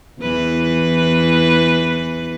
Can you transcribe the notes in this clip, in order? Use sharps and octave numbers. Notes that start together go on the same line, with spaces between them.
E2 E3 B4